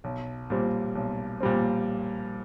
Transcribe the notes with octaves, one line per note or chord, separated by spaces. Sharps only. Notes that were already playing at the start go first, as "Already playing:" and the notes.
B1
A#2 G3 C4
B1
A#2 G3 C4